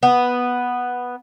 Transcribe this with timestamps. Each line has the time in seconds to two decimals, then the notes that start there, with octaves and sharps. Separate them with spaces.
0.03 B3